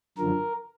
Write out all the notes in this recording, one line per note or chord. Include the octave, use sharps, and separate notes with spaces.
F#2 D3 F3 A#4